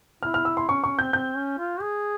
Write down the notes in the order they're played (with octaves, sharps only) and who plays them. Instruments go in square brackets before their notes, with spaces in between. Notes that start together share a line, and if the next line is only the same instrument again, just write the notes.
[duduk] E4 [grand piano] F6
[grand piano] F6
E6
C6
[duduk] C#4 [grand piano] C#6
[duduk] C#4 [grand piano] C#6
[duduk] C4 [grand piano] G6
[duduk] C4 [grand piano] G6
[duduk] C#4
F4
G#4